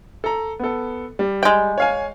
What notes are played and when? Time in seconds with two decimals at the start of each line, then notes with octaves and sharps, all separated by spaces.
0.24 A4 A#5
0.60 B3 A4
1.19 G3
1.43 G#3 G5
1.78 C#5 F5 G#5